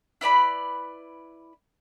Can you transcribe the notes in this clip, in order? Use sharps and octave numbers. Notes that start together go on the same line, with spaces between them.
E4 B4 D5 B5